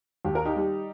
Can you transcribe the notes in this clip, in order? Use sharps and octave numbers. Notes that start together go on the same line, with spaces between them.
D#2 G4
A#4
D#4 G4
G3